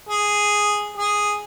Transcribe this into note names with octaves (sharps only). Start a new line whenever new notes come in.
G#4
G#4